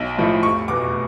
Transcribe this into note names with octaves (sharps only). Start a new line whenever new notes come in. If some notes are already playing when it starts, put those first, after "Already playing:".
Already playing: B1
A2 F3 A3
F1 C#6
E2 B2 D6